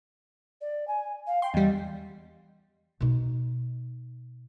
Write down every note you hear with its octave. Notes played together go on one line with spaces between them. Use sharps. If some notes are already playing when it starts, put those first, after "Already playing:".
D5
G#5
F5
G5 C6
E2 G3 D#5
B2 D#4